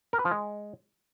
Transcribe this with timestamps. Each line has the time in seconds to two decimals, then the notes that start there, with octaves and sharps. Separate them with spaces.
0.13 A#4
0.19 B4
0.25 F3
0.31 G#3